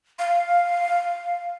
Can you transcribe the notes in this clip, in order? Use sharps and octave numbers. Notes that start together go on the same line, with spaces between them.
F5